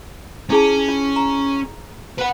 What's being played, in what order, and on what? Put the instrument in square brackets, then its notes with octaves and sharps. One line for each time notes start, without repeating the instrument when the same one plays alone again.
[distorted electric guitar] C#4 [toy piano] E4 G#4 A5
[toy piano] F4
A#5
[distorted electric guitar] B4 F#5